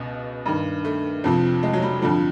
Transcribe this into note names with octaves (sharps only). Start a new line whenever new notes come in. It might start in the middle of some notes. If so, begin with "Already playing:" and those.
Already playing: C#2 B2
G2 D#3
A3
F2 C3 F3
G#3
F#3
G3
F2 D3 F3 G3